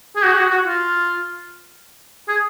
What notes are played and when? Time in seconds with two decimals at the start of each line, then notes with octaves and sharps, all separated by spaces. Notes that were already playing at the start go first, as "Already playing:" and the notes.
0.16 G#4
0.24 F#4
0.32 G#4
0.38 F#4
0.51 F#4
0.65 F4
2.29 G#4